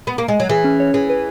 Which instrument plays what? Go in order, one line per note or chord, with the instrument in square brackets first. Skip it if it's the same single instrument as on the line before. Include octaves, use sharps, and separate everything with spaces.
[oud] B3
A#3
G#3
F#3
[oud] E3 [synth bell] G#4
[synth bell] C#4
C#5
[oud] E3 [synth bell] G#4
[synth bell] B4